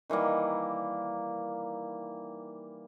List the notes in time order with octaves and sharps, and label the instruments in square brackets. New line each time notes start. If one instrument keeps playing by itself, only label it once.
[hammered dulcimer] D#3 E3 G3 A#3